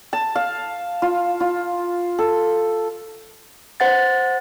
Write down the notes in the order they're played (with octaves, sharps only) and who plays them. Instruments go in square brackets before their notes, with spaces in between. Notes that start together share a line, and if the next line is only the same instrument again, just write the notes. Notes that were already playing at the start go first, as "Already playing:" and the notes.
[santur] A5
F5
F4
F4
A4
[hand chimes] C5 F#5 A6